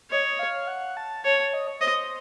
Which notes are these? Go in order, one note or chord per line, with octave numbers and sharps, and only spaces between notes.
C#5 D#5
F5
F#5
A5
C#5 A5
A5
D#5
C#5
C5 D#5